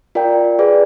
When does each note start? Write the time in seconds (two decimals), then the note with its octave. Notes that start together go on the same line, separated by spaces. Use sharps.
0.15 F4 A#4 D5 G5
0.59 G#4 B4 D5